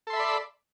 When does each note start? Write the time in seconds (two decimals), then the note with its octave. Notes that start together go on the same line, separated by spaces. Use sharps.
0.07 A4
0.10 C6
0.13 E5
0.16 B5
0.20 D5